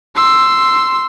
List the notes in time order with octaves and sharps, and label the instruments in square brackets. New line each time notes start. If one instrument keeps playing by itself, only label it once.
[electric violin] C6 E6